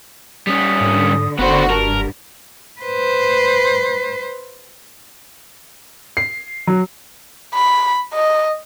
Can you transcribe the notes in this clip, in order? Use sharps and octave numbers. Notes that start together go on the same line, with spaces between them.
G3 C#4 D#6
G#2 D3
F#1 D3 B3 F#4 C5 B5
G2 A#4 A5
B4 C5
C7
F#3
B5
D#5